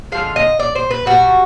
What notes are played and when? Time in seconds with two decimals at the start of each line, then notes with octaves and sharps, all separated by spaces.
0.12 D3 F3 G#3 F5
0.36 D#5
0.60 D5
0.75 C5
0.91 B4
1.06 B2 G3 F#4